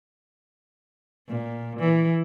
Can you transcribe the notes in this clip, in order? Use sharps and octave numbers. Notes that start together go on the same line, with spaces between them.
A#2
E3